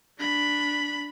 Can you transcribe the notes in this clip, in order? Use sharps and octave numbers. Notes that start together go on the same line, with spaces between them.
D4 B5